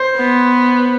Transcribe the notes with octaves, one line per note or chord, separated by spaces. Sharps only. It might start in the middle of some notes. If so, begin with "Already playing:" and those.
Already playing: C5
B3